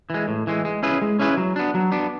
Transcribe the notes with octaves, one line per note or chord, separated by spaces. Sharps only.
E3 G#3
A2
E3 G#3
G#3
C#4 E4 G#4 B4
G#3
C#4 E4 G#4 B4
F#3
B3 D4
F#3
B3 D4